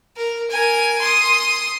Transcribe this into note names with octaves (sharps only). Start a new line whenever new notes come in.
A#4
A#4 G#5
C6 D#6